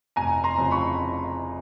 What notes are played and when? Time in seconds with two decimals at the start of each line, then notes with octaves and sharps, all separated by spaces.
0.16 F1 G#5 A#5
0.44 A#5 C6
0.58 F2 C#3
0.71 B5 C#6